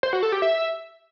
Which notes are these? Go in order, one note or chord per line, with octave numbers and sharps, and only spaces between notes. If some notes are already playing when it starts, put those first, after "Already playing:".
C5
F#4
A4
G4
E5